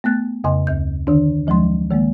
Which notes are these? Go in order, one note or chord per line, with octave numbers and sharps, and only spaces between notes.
A3 B3 F#6 A6
F2 C#3 D#5 G#5 C6
D2 G6
D3 D#3 D4
D2 F3 F#3 G#3 C6
D#3 G#3 A#3